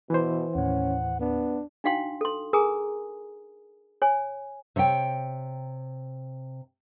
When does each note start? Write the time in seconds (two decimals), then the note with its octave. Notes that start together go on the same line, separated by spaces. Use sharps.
0.10 B2 E3 C5
0.55 D#2 A2 C#4 F#5
1.20 B3 D4
1.84 D4 D#4 F#4 F5 G5 C6
2.21 A4 C6
2.53 G#4 A#4 G#5 A#5 D#6
4.02 C#5 G#5
4.76 C3 C#5 D#5 G5